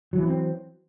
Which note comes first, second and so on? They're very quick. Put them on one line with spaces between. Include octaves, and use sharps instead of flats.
F#3 E3 B3 C4